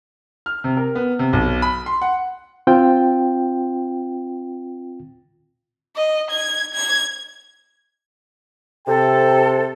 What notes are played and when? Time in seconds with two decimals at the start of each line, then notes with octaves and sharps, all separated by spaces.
0.46 F6
0.64 C3
0.77 A#4
0.95 B3
1.19 C3
1.33 B1
1.62 B5
1.86 C6
2.02 F#5
2.67 C4 F4 G5
5.96 D#5
6.30 G#6
6.74 G#6
8.87 C3 A4 G5